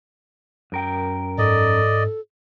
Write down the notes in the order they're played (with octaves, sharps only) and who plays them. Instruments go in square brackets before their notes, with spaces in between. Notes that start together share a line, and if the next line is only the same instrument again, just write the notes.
[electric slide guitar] F#2 A#4 G5
[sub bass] G#2 [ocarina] A4 [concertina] D5 D#5